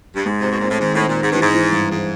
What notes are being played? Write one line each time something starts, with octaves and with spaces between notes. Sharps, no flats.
G2
G#2 G#3
C3 C4
B2
A#2 C4
A2
G#2 D#3
A2 C4
A#2
C4
G#2
G2 E3
G#2
E3
G2
G#2 E3